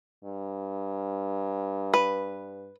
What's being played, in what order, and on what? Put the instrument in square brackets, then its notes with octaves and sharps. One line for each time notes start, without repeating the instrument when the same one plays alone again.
[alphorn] G2
[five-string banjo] B4